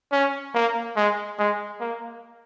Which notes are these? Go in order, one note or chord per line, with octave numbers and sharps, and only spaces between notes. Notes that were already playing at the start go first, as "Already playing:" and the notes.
C#4
A#3
G#3
G#3
A#3